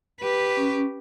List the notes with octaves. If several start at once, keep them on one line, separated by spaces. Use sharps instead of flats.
G4 B4
C#4